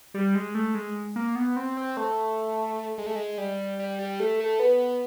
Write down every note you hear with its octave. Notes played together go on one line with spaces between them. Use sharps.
G3
G#3
A3
G#3
A#3
B3
C4
C4
A3
G#3
A3
G#3
G3
G3
G3
A3
A3
B3